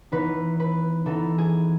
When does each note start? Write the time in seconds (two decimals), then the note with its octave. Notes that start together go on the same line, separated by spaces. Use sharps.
0.12 E3 B3 D#4 B4
0.60 B4
1.06 E3 B3 D#4 A4
1.38 G#4